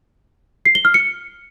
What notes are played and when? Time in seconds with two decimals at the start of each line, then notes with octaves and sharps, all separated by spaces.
0.65 C7
0.75 G7
0.85 F6
0.94 C#7